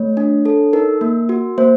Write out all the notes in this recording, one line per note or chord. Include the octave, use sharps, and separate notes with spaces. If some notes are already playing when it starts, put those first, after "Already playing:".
Already playing: A3 C#5
D4
A4
D#4 A#4
A#3
F#4
A#3 C5